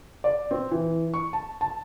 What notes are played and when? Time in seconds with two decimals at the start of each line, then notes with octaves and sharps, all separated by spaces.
0.24 D5
0.51 C4
0.71 E3
1.14 C#6
1.33 A5
1.61 A5